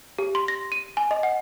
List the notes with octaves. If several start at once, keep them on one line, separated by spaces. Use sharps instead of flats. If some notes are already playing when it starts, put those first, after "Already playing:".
G4
C6
A#6
D#7
G#5
D#5
F#5